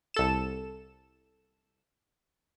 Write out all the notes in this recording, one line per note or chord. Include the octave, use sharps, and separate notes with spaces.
C2 A4 E7